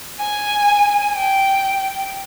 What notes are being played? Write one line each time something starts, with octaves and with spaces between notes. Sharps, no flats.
G#5
G5